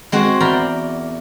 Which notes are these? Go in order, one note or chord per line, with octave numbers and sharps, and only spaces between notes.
G#3 C4 F#4
E2 A#4 D5 G5 A#5 B5